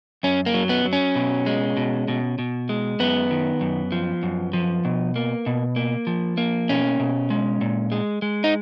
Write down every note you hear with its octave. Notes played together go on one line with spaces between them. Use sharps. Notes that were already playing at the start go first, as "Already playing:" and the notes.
F#2 C#4
A#3
F#3
B3
F#3
C#4
B2
G#3
B2
B2
B2
G#3
F#2 B3
D#3
F#2
F3
F#2
F3
B2
A#3
B2
A#3
F3
A#3
B2 C#4
B2
G#3
A#2
G#3
G#3
D#4